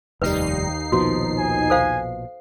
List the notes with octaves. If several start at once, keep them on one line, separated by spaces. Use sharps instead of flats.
F1 D#2 G#2 G3 D#4 B4 C7
A#1 B2 F3 F#4
G#5
A4 C5 F5